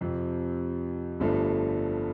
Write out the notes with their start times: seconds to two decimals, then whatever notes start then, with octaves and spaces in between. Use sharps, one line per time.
0.01 F2 C3 F3
1.20 G1 G2 F3 A3